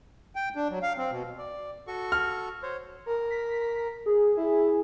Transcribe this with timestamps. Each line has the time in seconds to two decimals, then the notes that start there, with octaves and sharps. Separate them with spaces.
0.36 G5
0.55 D4
0.70 F#3
0.83 F5
0.97 C4
1.11 B2
1.38 D5
1.87 F#4 A4 C#6
2.12 F6
2.63 C5 C#5
3.06 A#4
3.30 B6
4.06 G#4
4.37 E4